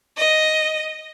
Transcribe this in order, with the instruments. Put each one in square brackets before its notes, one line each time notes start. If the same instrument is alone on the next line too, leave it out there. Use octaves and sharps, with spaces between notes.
[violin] D#5